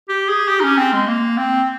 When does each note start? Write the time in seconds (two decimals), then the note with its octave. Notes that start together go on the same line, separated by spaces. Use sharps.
0.09 G4
0.29 G#4
0.48 G4
0.60 D#4
0.64 C#4
0.78 C4
0.92 G#3
1.08 A#3
1.38 C4